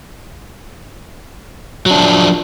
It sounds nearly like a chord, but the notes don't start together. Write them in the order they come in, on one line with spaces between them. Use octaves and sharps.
F#3 D4 F3